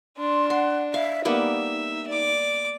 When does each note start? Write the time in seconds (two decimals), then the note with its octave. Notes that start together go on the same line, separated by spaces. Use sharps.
0.18 D4 C6
0.50 F#5 C6
0.94 E5 F5
1.25 G3 A#3 B3 D#4 E5
2.08 D5 D6